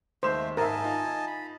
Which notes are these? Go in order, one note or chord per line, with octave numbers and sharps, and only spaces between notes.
D#2 G#3 A3 C5 E5 E7
G#2 A#4 D#5 E5 G#5 A5
D#4 F4
B5